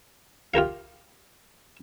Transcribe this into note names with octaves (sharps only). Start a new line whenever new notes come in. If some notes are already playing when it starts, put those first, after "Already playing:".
F4 G4 A#4 F5